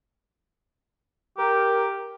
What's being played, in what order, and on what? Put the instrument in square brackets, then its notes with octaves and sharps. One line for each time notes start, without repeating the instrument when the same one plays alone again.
[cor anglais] G4 [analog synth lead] A#4